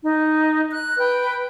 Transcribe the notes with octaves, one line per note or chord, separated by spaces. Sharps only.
D#4
F#6
B4 G5